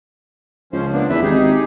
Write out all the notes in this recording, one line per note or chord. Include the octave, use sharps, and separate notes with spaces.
C#2 F3 C#4 C5
A#3 B3 D4
E2 B4 E5
G#1 D#4 G4 G#4